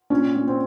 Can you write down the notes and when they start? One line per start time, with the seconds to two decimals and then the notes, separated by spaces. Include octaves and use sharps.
0.10 A#2 C#4
0.35 A#2
0.47 C4